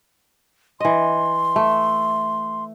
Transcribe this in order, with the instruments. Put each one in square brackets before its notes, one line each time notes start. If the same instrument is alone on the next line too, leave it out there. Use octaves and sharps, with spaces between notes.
[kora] E3 D#5 [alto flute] C6
[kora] A3